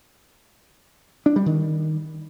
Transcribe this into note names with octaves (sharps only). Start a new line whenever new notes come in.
D4
G3
D#3